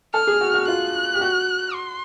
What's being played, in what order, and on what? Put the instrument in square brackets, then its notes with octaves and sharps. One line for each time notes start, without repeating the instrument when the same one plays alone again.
[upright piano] A4 [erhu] F6
[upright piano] G#4
F#4
F#4
[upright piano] F4 [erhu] F#6
[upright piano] G4
F#4
[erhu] C6